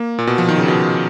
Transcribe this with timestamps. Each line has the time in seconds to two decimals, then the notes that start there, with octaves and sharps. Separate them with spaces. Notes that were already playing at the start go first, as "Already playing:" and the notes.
Already playing: A#3
0.18 A#2
0.27 B2
0.38 F3
0.48 D#3
0.58 C#3
0.68 B2